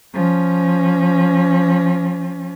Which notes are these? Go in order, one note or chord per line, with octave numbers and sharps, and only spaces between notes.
F3 C#4